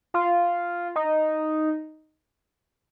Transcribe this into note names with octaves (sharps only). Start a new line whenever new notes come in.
F4
D#4